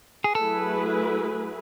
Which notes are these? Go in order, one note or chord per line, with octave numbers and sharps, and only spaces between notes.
G#4
F#3 A3 E4 G#4 A4 B4